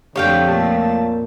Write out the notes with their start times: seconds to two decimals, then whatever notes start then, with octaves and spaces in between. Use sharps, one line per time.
0.15 F2 D3 A3 G4 C#5 F5 G5
0.48 A#2 A5